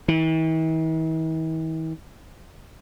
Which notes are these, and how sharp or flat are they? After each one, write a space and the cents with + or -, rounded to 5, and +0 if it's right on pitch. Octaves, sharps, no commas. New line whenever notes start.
E3 -45